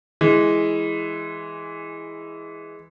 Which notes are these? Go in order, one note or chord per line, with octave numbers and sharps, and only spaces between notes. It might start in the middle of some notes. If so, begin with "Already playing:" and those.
E3 G#3